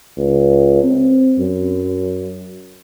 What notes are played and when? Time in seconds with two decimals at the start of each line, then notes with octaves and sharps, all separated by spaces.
0.17 C#2
0.84 C4
1.39 F#2